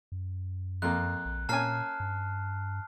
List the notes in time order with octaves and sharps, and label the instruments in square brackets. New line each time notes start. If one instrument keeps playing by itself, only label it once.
[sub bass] F#2
[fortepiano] F2 A#3 [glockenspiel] F#6
[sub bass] A#1
[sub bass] A#2 [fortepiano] A#3 C#4 G#5 [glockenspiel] A5 F6 C7
[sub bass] G2